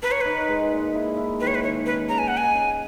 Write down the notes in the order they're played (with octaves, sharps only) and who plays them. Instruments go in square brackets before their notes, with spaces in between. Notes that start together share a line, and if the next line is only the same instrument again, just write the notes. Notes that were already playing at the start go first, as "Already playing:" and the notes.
[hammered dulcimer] A#4 [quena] B4
[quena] C#5
[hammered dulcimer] D#4 [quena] B4
[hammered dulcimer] G#3
A#2
E4
E4
[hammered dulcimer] D#3 [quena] B4
[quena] C#5
B4
[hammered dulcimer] D#3 [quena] C#5
[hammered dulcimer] C#4 [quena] B4
[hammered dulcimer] C#3 [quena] A#5
[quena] G#5
[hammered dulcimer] G#3 [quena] F#5
[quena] G#5
[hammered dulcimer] C#3